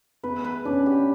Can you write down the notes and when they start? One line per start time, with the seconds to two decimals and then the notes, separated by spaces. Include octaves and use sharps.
0.23 B3 B4
0.44 B4
0.65 C#4 D4
0.86 G4